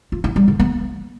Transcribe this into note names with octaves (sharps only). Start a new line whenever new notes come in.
F4
E4
G3
D3
B3